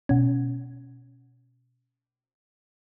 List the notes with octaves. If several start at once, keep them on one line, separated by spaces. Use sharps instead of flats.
B2 C#4